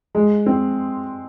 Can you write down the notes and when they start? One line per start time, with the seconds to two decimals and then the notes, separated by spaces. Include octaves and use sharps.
0.15 G#3
0.46 C4